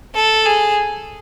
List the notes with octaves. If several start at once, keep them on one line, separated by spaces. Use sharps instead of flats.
A4
G#4